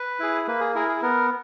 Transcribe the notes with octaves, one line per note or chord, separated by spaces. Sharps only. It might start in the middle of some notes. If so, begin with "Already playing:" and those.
Already playing: B4
E4 G#4
A#3 B4
G#4
E4 G#4 A#4
G#4
B3 A#4